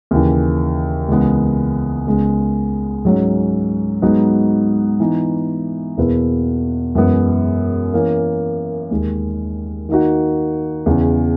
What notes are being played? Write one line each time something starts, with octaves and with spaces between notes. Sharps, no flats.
D#2 C#3 E3
C#2 C#3 E3 G#3 B3
C#2 C#3 G#3 B3
G#2 F#3 C#4
G#2 F#3 B3 D#4 F#4
E3 B3 D#4
E2 B2 A#3 E4 B4
F#2 E3 G#3 B3
E3 A#3 C#4
D#2 D#3 G#3
D#3 A#3 D#4 F#4
E2 C#3 E3